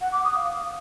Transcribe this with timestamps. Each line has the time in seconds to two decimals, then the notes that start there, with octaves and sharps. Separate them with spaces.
0.01 F#5
0.13 D6
0.24 D#6
0.36 F5